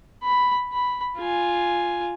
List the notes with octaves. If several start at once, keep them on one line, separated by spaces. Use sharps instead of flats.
B5
B5
F4 G#5